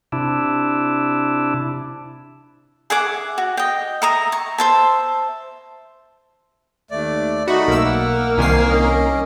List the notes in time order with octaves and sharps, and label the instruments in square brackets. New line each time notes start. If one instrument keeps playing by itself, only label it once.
[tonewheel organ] C3 D4 E4
[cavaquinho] G#4 E5 F#5 D6
F#4
D#5 G5
E5 A#5 D#6
C#6
C5 E5 A5
[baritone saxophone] D#2 [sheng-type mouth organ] A3 D5
[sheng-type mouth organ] A3 D#4 B5 [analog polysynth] F#4
[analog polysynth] B1 E6 [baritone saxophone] A#3
[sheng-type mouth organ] F#5
[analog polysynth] C2 D#3 C7 [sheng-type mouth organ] G#5
[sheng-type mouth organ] C#4 D#5